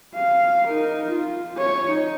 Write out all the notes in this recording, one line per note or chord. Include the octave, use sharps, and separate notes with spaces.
F5
D#4 A#4
F4
C#5
D#4